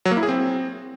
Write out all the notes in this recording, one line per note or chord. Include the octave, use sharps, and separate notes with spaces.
F#3
A#3
E4
G#4
C4